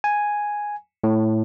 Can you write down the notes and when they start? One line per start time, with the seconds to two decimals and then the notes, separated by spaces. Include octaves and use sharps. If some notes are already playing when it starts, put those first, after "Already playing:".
0.04 G#5
1.04 A2